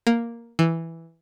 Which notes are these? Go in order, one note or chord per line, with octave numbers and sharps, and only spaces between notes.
A#3
E3